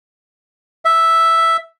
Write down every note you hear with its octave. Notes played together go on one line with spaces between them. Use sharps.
E5